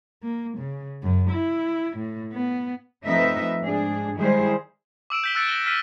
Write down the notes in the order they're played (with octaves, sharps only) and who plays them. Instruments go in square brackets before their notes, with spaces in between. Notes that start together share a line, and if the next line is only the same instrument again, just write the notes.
[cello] A#3
C#3
F#2
E4
A2
B3
[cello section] F3 A3 C4 D#4 B4 E5
G#2 D4 G#4
D#3 G3 G#3 E4 G#4 C5
[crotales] D6 E6 D7 E7
G6 B6 G7
E6 F#6 A6 C#7 D7
A#6 D7 G7
F6 B6 D#7